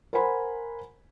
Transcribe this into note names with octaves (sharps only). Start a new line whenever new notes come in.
A#4 C5 F#5 G#5 B5 C6